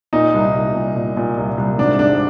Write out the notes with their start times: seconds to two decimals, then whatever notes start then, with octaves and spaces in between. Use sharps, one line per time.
0.13 A#2 D#4
0.34 C2
0.54 C2
0.75 A#2
0.96 A#2
1.17 A#2
1.37 C2
1.58 C2
1.78 G#1 D4
1.99 G#2 D4